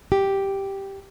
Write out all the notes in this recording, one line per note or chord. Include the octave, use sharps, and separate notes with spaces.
G4